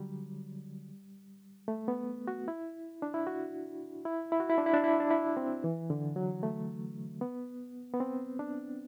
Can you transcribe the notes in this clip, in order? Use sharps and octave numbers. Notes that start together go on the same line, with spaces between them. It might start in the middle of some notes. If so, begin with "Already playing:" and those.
Already playing: D3 F#3 G3
A3
B3
F#4
E4
D4
E4
F#4
E4
E4
F#4
E4
D4
E4
D4
E4
D4
E4
C4
E3
D3
F#3
A3
B3
B3
C4
D4